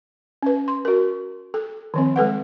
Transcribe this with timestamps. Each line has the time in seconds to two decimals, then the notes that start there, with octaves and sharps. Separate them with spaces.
0.43 C#4 B4
0.68 C6
0.85 F#4 A#4
1.54 A4
1.94 D#3 F3 C4
2.16 G#3 A4 B4 F#5